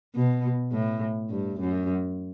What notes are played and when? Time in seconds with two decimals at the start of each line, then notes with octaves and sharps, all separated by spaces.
0.15 B2
0.72 A2
1.30 G2
1.60 F#2